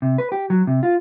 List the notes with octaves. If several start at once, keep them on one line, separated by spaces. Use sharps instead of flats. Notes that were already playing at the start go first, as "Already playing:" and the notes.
C3
B4
G4
F#3
C3
F4